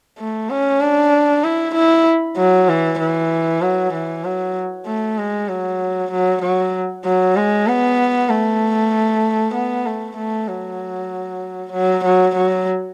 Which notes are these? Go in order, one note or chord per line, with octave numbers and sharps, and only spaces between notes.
A3
C#4
D4
E4
E4
F#3
E3
E3
F#3
E3
F#3
A3
G#3
F#3
F#3
F#3
F#3
G#3
B3
A3
B3
A3
A3
F#3
F#3
F#3
F#3